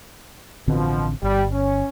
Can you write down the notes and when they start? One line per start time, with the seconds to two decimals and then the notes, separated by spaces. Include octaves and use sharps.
0.67 A1 B2 D3 F3 C4
1.23 G1 G3
1.52 C#4